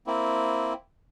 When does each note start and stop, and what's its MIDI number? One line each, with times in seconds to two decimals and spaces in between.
0.07 0.73 58
0.07 0.73 60
0.07 0.73 64